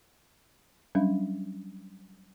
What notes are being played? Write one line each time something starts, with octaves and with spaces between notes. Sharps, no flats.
F#3 G3 C#4 D4